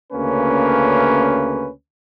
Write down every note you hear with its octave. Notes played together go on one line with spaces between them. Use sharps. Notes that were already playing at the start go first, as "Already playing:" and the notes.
D2 C#3 A#3 C#4 B4